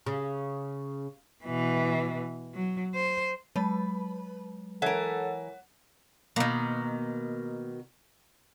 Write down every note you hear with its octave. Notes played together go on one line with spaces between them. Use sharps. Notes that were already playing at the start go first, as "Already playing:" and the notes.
C#3
B2 E3
F#3
C5
F#3 G#3 B4
E3 A4 A#4 C#5 F#5
B2 D#3 A#3 A#5